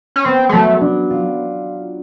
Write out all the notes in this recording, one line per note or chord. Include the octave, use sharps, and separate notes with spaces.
C#4
B3 C4
G#3
F#3 A3
D4
F4